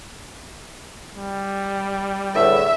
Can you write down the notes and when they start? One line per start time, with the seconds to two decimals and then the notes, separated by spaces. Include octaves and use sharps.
1.15 G3
2.35 E2 A2 D3 E5